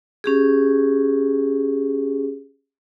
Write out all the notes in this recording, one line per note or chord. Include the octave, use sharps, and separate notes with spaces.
C#4 G4 G#4